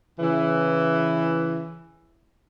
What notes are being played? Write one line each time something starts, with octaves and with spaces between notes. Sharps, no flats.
C#3 E3